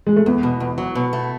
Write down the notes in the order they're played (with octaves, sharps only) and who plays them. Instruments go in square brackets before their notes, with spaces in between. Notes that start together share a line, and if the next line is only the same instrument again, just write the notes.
[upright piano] G#3
A3
[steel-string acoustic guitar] E2 [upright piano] B3
[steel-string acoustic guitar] B2
E2
F#3
B2
A3